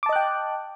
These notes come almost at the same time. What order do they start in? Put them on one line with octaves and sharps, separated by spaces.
D6 A5 D#5 F#6 G5